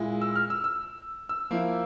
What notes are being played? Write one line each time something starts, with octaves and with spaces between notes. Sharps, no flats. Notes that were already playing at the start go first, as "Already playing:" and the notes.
Already playing: A#2 G#3 E4
E6
F6
E6
E6
E6
F3 A#3 E4